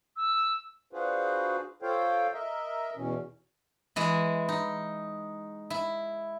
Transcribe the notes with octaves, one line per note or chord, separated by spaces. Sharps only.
E6
D4 F4 F#4 G#4 B4 C5
F4 A4 C5 C#5 F5 G5
A#4 D#5 E5
E2 B2 E3 C#4
E3 G#3 E4
D#4
E4